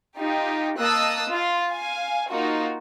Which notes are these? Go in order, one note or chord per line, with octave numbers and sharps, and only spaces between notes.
D#4 F4 G4
A#3 D#5 A5 D#6 E6 F#6
F4
F5 G#5
A#3 D#4 F4 F#4